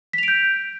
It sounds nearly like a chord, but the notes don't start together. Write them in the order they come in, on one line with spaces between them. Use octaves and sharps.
B6 F7 D7 G6